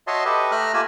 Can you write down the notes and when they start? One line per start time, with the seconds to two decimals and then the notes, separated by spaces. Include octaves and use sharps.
0.07 F#4 C#5 D#5 E5 A5 C6
0.25 G4 A4 B4 D#5 E5
0.52 A3 E5 A#5 F6 F#6
0.74 A3 A#3 F4 G4 G#5 E6